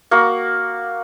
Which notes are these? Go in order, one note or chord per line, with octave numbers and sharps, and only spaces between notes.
A#3 F#4